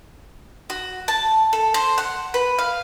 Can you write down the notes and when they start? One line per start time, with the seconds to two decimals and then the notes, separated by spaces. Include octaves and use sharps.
0.70 F#4
1.08 A5
1.53 A4
1.74 C5
1.98 F#5
2.34 B4
2.59 F5